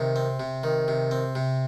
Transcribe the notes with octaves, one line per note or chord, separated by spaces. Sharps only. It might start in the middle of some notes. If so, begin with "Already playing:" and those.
Already playing: C3 D#3
C4
C3
D#3
C3
C4
C3